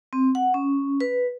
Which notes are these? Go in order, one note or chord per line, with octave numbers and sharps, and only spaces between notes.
C4
F#5
C#4
B4